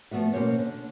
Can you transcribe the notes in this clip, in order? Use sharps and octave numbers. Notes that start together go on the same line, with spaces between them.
F3 A3 B3 F#4 E5
B2 A#3 C#4 C5 C#5
D3